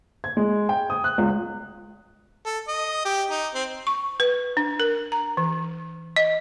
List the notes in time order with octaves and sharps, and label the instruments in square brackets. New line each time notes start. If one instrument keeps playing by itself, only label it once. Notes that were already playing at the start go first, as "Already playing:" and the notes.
[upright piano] G#6
G#3
G5
D#6
F#6
C#2
[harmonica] A4
D#5
G4
D#4
C4
[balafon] C#6
B4
D4
A#4
A#5
E3
D#5